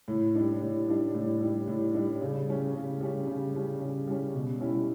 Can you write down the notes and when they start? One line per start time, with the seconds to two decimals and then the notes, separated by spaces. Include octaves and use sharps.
0.08 A2
0.35 G3 D4
0.62 A2
0.88 G3 D4
1.15 A2
1.41 G3 D4
1.68 A2
1.94 G3 D4
2.21 C#3
2.48 G3 C#4
2.74 C#3
3.01 G3 C#4
3.27 C#3
3.54 G3 C#4
3.81 C#3
4.07 G3 C#4
4.34 B2
4.60 G3 C#4 E4